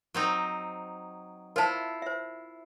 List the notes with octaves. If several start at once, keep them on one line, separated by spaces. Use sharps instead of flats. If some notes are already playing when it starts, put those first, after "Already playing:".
F#3 C4 D#4
E4 F4 A#4 C5 A5
C5 E5